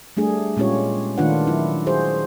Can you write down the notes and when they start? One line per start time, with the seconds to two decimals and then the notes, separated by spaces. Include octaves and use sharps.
0.17 G3 A3 D4 G#4
0.57 A#2 G#3 C#4 F4 G4 C#5
1.18 D#3 A3 D4 F4 B4 F#5
1.47 F#3 E4
1.86 F#4 G#4 C5